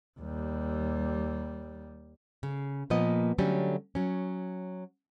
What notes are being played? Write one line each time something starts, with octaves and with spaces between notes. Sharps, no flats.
D#2 G3
C#3
A#2 F3 A#3 B3 D#5
D3 F#3 G3 A3 C#4
F#3 C#4